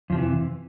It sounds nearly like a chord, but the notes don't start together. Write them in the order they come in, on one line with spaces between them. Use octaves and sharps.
F2 F3 C3 E3